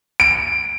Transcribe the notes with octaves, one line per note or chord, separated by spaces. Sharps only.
D7